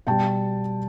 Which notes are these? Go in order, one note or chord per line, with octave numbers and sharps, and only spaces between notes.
B2 G3 G5 A5